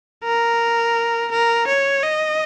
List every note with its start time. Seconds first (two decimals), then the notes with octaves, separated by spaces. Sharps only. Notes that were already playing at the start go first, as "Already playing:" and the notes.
0.24 A#4
1.32 A#4
1.68 C#5
2.03 D#5